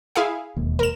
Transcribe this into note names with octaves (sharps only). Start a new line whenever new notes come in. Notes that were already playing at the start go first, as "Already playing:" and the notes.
E4 G#4 F5
E1 D#2
A#4 E7